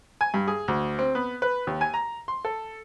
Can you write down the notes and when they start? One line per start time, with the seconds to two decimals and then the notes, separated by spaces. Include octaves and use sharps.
0.21 G#5
0.34 G2
0.48 G#4
0.68 D2
0.99 C4
1.15 B3
1.42 B4
1.67 D#2
1.81 G#5
1.94 A#5
2.28 C6
2.45 A4